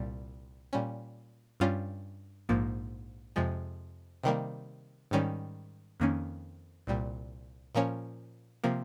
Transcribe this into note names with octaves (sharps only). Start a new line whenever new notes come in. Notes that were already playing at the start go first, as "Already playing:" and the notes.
Already playing: C2 A#2 G3
A#2 G3 C#4
G2 G3 C#4 F4
A#1 G#2 F3 A#3
F2 C3 F3 G#3
C3 D#3 G3 A#3
G#2 D#3 G3 C#4
F2 D#3 A#3 C#4
C2 A#2 G3
A#2 F3 A#3 C#4
C3 F3 A#3